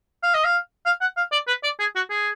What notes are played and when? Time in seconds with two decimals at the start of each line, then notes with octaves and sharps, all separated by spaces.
0.23 F5
0.34 D#5
0.44 F5
0.86 F5
1.01 F#5
1.17 F5
1.32 D5
1.47 B4
1.63 D5
1.79 G#4
1.95 F#4
2.10 G#4